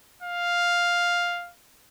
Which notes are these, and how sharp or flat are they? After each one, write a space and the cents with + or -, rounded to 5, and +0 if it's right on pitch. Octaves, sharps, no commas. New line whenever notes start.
F5 +5